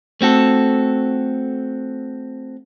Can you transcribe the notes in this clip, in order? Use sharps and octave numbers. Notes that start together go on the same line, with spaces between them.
A3 C4 F#4 A4